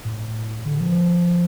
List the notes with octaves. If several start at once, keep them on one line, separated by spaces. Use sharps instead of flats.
A2
D3
F3